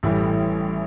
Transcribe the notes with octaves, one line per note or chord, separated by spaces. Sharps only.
A1 A2 E3 G3